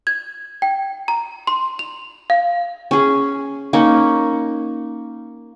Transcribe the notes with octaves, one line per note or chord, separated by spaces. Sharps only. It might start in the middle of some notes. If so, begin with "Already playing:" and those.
G#6
G5
A#5
C6
F7
F5
C#4 G#4
A#3 C#4 D#4